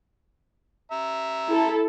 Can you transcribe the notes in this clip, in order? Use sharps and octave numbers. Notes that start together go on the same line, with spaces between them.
E5 A#5
E4 A4